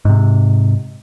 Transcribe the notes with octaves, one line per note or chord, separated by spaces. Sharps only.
G#2 C3